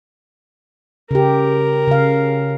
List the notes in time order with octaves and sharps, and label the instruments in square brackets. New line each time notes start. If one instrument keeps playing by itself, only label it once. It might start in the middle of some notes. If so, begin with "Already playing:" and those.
[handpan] C#3 G4 [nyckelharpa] A#4
[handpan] C#3 F5